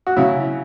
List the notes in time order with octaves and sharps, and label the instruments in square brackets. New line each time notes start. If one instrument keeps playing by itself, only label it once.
[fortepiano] F#4
C#3 F#3 E4